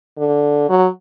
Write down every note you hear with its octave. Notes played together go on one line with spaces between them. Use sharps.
D3
F#3